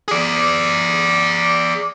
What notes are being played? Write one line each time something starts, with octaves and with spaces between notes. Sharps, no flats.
G#4 D5